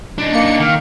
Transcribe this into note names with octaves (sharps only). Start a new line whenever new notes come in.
D4 D#4
A#3 C#7
D#3 F5